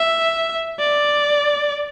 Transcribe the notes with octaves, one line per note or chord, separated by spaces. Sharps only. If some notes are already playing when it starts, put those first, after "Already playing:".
Already playing: E5
D5